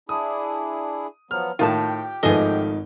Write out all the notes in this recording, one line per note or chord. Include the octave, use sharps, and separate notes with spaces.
D4 E4 G#4 D#6
F3 F#3 B3 F6
A2 D#3 F4 G4 G5 A5
G#1 F3 A3 B3 D#4 G#4 D#5 G7